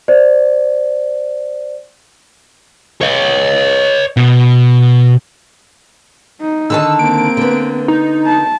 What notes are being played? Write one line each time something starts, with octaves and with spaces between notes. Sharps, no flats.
C5 D5
C#5 D#5
B2
D#4
D3 D#3 A5 E6
A#3 C4 D7
D3 B3
D#4
A5